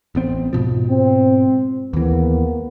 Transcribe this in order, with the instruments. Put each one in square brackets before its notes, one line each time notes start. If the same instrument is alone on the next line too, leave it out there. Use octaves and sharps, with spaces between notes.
[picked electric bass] A1 B3 C4
G#2 B2 F3
[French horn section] C4
[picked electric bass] D#2 E3 [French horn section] G#3 A#3 B3